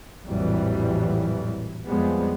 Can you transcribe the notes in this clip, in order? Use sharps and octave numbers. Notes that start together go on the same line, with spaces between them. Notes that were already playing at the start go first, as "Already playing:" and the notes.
A#1 F2 A2 E3 F#3 G3
F2 F3 G3 G#3 B3